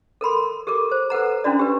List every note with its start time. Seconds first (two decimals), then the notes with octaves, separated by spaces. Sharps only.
0.21 A4 A#4 B5 C6
0.67 G4 A4 A#4 D6
0.91 C5
1.10 A4 B4 F#5 A#5
1.44 C#4 D4 E4 F#4 D5
1.59 G4 B4